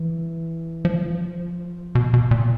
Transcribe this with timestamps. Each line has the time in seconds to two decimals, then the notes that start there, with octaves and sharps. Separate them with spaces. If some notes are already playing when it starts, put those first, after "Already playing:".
Already playing: E3
0.85 F3
1.95 B2
2.14 B2
2.31 A#2